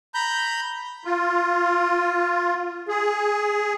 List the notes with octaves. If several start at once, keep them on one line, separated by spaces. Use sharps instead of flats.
A#5 B5 G6
F4
G#4